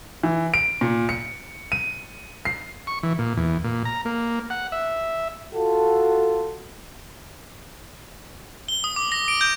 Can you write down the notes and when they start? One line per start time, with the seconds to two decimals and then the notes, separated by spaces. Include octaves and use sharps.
0.23 E3
0.54 D7
0.81 A#2
1.09 C#7
1.72 D#7
2.45 C7
2.87 C#6
3.03 E3
3.19 A#2
3.37 E2
3.64 A#2
3.85 A#5
4.05 A#3
4.50 F#5
4.72 E5
5.54 F4 F#4 A4
8.68 G7
8.84 D#6
8.96 D6
9.12 A#6
9.28 D7
9.41 G6